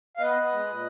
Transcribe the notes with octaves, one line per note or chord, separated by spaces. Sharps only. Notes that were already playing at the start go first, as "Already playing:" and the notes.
F5
B3 B4 D#5
B3
G#3
A#2